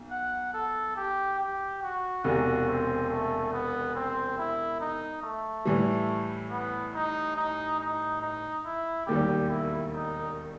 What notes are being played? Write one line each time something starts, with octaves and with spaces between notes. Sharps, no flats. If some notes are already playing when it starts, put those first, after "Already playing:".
Already playing: B1
F#5
A4
G4
G4
F#4
E1 E2 C3 F#4
C4
A3
B3
C4
E4
D#4
A3
A2 E3 G3
B3
D#4
D#4
D#4
D#4
E4
E1 D#2 D#3 G3 G4
E4
D#4